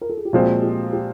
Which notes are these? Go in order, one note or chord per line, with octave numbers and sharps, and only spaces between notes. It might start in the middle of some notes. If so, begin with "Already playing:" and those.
A#4
A4
G#4
G4
A#2 F3 G#3 C4 F#4
G4
G4